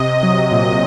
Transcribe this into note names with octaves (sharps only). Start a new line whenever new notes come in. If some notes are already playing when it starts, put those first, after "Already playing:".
Already playing: C3 D#5
F#3
A#2